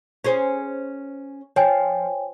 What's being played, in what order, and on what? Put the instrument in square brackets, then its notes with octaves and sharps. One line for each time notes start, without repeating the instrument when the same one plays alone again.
[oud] C#4 G#4 C5
[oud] F3 [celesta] C#5 G5 G#5